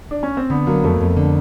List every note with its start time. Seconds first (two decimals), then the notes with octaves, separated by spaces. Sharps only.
0.11 D4
0.23 C#4
0.37 C4
0.50 D3 B3
0.67 F#3 A#3
0.84 F2 A3
1.01 F2
1.17 D3